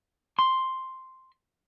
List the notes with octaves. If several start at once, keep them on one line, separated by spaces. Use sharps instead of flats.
C6